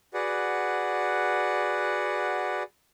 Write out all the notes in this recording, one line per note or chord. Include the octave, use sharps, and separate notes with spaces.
F#4 G#4 B4 D5 F#5